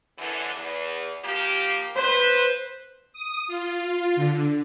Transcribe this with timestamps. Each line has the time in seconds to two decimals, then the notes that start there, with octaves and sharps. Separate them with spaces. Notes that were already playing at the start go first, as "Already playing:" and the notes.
0.18 F#2 D3 E3
0.52 E2
1.23 F3 A#3 G4
1.96 B4 C5
3.13 D#6
3.48 F4
4.16 D3